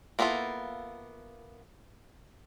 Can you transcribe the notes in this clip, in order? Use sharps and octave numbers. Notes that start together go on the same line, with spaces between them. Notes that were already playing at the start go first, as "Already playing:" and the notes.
A#3 B3 E4 F4 A4